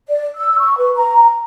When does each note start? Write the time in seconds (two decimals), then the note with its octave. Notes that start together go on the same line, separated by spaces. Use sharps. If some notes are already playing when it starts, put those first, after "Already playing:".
0.08 D5
0.36 E6
0.59 C#6
0.78 B4
0.96 A#5